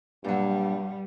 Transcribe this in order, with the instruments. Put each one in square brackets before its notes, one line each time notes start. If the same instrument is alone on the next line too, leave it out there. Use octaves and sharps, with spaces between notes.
[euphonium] G2 [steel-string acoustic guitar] A#2 F#3 [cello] G3